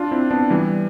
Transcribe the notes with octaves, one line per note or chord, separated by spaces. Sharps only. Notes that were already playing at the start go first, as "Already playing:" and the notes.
Already playing: D4 F4
C4 E4
B3 D4
E3 G3